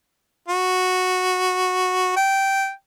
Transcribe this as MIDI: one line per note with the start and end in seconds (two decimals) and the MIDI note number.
0.49 2.16 66
2.16 2.71 79